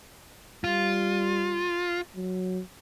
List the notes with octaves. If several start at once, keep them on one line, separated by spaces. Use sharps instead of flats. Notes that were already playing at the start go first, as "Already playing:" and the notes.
G3 F4
F#3